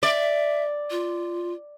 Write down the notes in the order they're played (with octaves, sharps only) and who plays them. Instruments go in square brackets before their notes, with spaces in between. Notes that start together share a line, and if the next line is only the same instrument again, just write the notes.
[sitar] D5 [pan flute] E5
[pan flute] F4